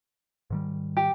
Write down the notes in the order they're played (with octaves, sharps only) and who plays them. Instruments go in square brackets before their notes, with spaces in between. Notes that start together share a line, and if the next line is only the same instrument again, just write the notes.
[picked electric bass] G#2 D#3 G3
[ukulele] G4